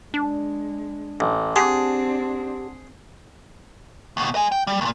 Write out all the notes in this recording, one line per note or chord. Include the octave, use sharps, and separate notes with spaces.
G#3 D4
A1
C4 D4 G4 G#4 F#5 A5 C6
D#2 B2
D#5 G#5
G5
G3
D#2 A#2